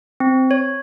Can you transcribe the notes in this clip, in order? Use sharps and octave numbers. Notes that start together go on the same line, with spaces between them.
C4
C#5